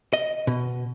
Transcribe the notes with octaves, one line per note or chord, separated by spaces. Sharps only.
D#5
B2